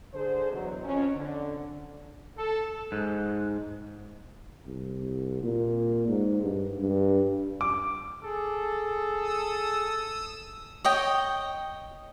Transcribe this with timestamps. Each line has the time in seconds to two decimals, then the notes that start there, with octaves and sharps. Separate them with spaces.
0.14 D3 G#4 C5
0.52 E2 B2 F#3
0.83 F2 C#4
1.15 D3
2.37 A4
2.92 G#2
4.66 C2
5.43 A#2
6.08 G#2
6.42 G2
6.80 G2
7.61 D6
8.24 G#4 A4
9.21 D#6 E6
10.84 C#5 D#5 G5